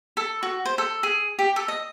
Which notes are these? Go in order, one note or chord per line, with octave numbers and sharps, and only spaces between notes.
A4
F#4
C5
A4
G#4
G4
A4
D#5